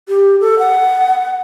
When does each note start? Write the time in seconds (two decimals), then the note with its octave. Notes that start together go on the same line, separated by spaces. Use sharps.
0.09 G4
0.41 A4
0.59 F#5